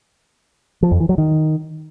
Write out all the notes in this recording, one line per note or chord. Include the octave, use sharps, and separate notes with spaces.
F3
F2
E3
F#3
D#3